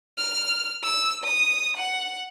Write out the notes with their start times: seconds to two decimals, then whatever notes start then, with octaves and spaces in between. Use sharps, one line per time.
0.17 F6
0.83 E6
1.24 D#6
1.77 F#5